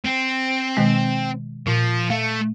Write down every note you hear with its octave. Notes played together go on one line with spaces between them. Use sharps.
C4
B2 D#3 G#3
A#2 F3
A3 F5